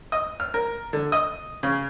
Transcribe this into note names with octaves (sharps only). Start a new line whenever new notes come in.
D#5
F6
A#4
D3
D#5
C#3